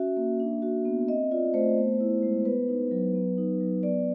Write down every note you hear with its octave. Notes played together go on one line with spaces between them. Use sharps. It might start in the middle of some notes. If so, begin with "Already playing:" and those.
Already playing: C#4 F#4 E5
A#3
D4
F#4
B3
C4 D#5
F4 D5
A3 C5
B3
E4
G#3
B3 B4
D#4
F#3
B3
D#4
F#3
B3 D5